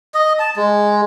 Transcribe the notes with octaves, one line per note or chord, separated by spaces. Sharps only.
D#5
A5
G#3